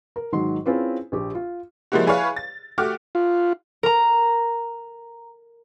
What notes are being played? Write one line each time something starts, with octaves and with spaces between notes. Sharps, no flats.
A#4
G#2 D#3 F#3 C6
C4 C#4 E4 F4 G#4 B4
A#1 G4
F4
F3 G3 G#3 A#3 E4 F#4
E4 G#4 B4 C#5 F5
A6
A3 F#4 G4 D6 F6
F4
A#4 A#5